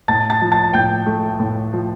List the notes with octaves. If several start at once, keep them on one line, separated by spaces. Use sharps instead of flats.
A2 A5 A6
A5 A6
F3
A5 A6
A2 G5 G6
A3
A2
F3